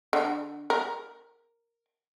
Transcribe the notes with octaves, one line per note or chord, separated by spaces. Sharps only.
D3
A#4